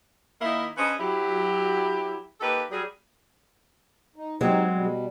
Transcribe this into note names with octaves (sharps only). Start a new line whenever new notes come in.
D#3 A#3 D#4 E4
C#4 D4 G#4 B4 C5 D#5
F#3 E4 G4
A#3 D#4 G4 A4 B4
F#3 G3 G#4
D#4
F#3 G#3 C4 D#4 G4 C5
B2 G3